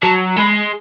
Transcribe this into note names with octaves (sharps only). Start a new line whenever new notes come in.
F#3 A5
G#3 B5